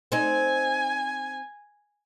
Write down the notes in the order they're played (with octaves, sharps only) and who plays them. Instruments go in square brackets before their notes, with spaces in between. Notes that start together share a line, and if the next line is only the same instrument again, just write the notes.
[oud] C4 D#4 [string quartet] G#5